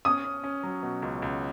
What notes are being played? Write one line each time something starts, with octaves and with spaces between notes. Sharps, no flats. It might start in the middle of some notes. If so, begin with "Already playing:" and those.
C#4 D#6
C#4
C#4
F#3
B2
C#2
C#2